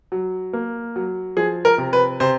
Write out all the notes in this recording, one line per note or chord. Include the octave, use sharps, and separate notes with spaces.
F#3
A#3
F#3
F3 G#4
A#4
C3
B4
C3 C5